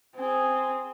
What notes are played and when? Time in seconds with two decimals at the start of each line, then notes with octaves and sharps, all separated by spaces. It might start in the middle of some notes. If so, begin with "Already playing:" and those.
0.16 C4 G#4